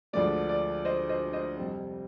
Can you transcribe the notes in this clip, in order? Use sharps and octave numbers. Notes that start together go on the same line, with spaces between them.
D2 D3 F3 G#3 D5
D5
C5 D#5
C5 D#5
C5 D#5
F2 C3 G3 C4